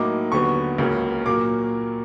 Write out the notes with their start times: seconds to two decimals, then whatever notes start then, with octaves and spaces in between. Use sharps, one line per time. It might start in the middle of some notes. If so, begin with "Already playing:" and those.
Already playing: A2 F#3 A#3 D#4 D6
0.32 D#2 D3 F#3 B3 C#6
0.78 C#2 C#3 F#3 A#3 C#4
1.26 A#2 F#3 A#3 D6